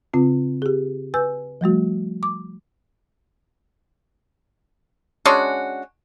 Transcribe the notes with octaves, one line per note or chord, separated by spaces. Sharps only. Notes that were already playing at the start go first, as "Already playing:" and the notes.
C#3 C4 F4
G4 G#4
B4 G#5 E6 G6
F3 G3 A3 F#4
D6
G#3 C#4 D4 F#4